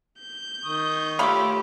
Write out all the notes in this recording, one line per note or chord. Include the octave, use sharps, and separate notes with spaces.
G6
D#3 C#6 D#6
A3 F4 G4 C#5 E5 B5 D6